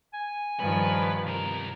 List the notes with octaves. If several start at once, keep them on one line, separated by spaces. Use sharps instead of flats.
G#5
G2 D#3 F3 B4
C3 A#4